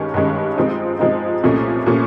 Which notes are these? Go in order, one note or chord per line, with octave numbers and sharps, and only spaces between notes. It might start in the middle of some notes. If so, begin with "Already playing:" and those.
Already playing: G2 D#3 G#3 C#4
G2 D#3 G#3 C#4
F3 G#3 C4 D#4
F3 G#3 C4 D#4
C2 A#2 F3 A3 C#4
A#2 F3 A3 C#4